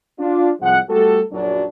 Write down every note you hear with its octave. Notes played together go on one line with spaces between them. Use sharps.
D4 F4
C2 F3 G#3 F#5
G3 A3 F#4 G4 A4
A#1 F#2 F#3 D4